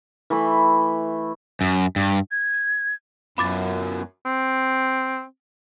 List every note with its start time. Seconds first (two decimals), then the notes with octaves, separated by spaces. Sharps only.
0.30 E3 A3 B5
1.61 F#2
1.96 G2
2.31 G#6
3.38 F#2 B3 E4 F4 B5 D6 A6
4.25 C4